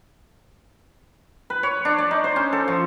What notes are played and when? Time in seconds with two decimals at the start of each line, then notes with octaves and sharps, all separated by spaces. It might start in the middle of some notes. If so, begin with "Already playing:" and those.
1.50 B4
1.63 C#5
1.85 D4
1.98 D5
2.11 D#4
2.24 C5
2.36 C#4
2.53 A4
2.68 F3